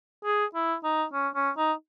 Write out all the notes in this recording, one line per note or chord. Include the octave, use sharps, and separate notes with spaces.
G#4
E4
D#4
C#4
C#4
D#4